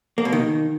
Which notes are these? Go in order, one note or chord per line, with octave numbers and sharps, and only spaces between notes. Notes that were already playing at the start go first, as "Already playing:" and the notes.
A#3
B2
D#3